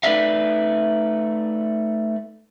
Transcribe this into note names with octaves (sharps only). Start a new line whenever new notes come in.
A3 D#4 B4 D5 E5 F5